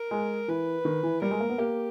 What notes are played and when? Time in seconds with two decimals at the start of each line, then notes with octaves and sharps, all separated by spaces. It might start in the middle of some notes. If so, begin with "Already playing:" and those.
Already playing: A#4
0.11 G#3
0.48 E3 B4
0.85 D#3
1.03 E3
1.22 G3 A#4
1.31 G#3
1.40 A#3
1.50 B3
1.58 A#3 G4